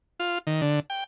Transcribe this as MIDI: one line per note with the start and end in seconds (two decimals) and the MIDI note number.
0.20 0.38 65
0.47 0.61 51
0.61 0.80 50
0.90 1.04 79